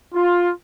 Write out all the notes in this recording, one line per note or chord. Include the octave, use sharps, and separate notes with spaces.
F4